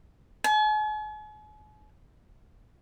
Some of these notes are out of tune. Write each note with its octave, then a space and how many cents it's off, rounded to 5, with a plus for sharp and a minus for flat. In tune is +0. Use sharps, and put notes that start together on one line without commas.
G#5 +45